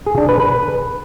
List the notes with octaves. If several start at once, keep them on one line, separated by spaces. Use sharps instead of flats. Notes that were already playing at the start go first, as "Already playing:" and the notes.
G#4
D4
B4
B4